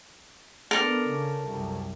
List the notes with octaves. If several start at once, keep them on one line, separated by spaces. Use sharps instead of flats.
B3 D4 A4 A#4
C#3
C2 F#2